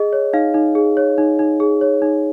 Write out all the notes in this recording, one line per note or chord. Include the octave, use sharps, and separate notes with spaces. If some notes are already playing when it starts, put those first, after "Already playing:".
Already playing: G#4 D#5
C#5
D#4 F5
D#4
G#4
C#5
D#4
D#4
G#4
C#5
D#4